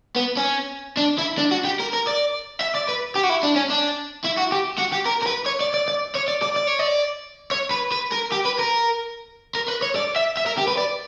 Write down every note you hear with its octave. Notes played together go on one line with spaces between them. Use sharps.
B3
C#4
D4
E4
D4
F#4
G4
A#4
A#4
D5
E5
D5
B4
G4
F#4
E4
D4
C#4
D4
E4
F#4
G4
F#4
G4
A#4
A#4
B4
C#5
D5
D5
D5
C#5
D5
D5
D5
C#5
D5
C#5
B4
B4
A#4
G4
B4
A#4
A#4
B4
C#5
D5
E5
E5
A#4
G4
B4
D5